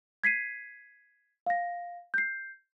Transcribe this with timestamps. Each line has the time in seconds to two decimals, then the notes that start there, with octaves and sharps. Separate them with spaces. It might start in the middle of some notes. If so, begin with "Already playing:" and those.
0.24 G#6 B6 C7 D#7
1.46 F5 A#6
2.14 G6 C7